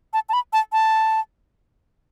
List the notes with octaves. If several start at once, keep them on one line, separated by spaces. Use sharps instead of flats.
A5
A5
B5
A5
A5